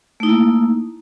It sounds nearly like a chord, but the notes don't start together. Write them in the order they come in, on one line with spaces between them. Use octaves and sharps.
A3 D#4 E4 A#3